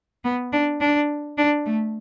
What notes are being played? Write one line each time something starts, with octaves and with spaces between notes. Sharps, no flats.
B3
D4
D4
D4
A3